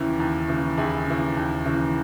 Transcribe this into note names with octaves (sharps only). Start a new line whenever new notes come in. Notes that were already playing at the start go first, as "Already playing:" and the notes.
Already playing: D#2 C#3 E3 C#4 E4
D#2
C#3 E3
D#2 E4 G#4
C#3 E3
D#2
C#3 E3